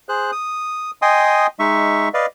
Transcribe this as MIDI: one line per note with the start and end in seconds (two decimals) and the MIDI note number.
0.09 0.31 68
0.09 0.31 72
0.09 0.31 90
0.32 0.91 87
1.02 1.47 75
1.02 1.47 79
1.02 1.47 80
1.02 1.47 84
1.02 1.47 87
1.59 2.09 56
1.59 2.09 63
1.59 2.09 76
1.59 2.09 85
2.14 2.26 71
2.14 2.26 74
2.14 2.26 75
2.14 2.26 77